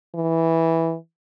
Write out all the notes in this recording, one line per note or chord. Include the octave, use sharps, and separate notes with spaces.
E3